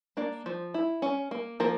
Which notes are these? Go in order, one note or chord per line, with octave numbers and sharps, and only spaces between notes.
A#3 D4 D5
F3
E4
C#4
A#3
F3 A#3 A#4